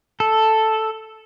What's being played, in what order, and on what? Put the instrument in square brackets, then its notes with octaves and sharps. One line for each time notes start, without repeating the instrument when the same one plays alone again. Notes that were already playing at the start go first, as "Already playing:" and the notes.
[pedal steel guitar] A4